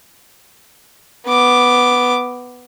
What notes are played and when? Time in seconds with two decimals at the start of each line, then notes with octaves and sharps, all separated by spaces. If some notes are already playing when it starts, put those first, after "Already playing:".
1.27 B3 D6